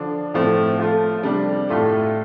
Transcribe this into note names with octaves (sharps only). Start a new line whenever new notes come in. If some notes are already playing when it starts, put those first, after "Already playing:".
Already playing: D3 F3 D4
A2 F3 A3 C4
F3 A3 F4 A4
C3 G3 D4
A2 A3 F4 A4